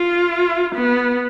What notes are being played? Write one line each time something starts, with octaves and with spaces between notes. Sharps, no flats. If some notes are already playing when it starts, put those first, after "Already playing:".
Already playing: F4
B3